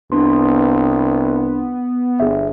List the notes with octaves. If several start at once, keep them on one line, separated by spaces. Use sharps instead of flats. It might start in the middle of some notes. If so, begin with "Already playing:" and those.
C2 B3 D4 C6
G1 G#4 E5